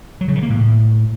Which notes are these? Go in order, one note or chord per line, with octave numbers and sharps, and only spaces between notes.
F#3
C#3
D#3
A#3
A2